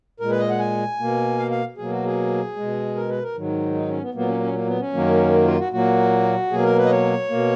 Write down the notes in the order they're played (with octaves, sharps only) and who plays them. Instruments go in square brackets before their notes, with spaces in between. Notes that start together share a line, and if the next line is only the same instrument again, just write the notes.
[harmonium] A#2 G#3 A#4
B4
D#5
F#5
G#5
B2 A#3
F5
F5
B2 F#3 A#3 G#4
F#4
G#4
B2 G#3
A#4
B4
A#4
G#2 D#3 F#3
D#4
C#4
B3
A#2 F#3 A#3 B3
C#4
C#4
A#3
B3
C#4
F#2 D#3 F#3 A#3
F4
F#4
A#2 F#3 A#3 F#4
B2 F#3 A#3 G#4
A#4
B4
D#5
C#5
B2 A#3